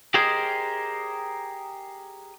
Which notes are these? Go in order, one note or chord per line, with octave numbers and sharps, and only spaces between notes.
G4 G#4 A#4 C5 D#5 G#5